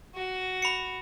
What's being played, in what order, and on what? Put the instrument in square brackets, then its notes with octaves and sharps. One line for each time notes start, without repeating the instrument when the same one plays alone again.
[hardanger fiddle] F#4
[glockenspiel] B5 C#7